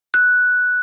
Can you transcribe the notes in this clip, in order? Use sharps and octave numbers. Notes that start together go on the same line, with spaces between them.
F#6